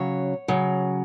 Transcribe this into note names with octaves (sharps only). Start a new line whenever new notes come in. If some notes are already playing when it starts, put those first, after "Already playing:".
Already playing: C#3 F#3 C#5
C#3 F#3